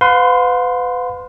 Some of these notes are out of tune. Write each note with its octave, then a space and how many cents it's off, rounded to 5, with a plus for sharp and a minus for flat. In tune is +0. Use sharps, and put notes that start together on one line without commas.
B4 +30 F5 +45 C6 +0